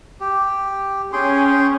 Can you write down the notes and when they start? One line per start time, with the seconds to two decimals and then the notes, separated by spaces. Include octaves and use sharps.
0.21 G4
1.13 C#4 G#4 G5 C6